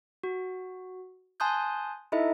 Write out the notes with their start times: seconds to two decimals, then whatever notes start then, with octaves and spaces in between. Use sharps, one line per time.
0.24 F#4
1.40 G#5 A5 C6 D#6 F#6 G6
2.12 D#4 E4 A4 D#5 E5